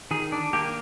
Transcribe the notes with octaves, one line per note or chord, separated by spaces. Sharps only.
D#3 G#4
D4
A#3 G4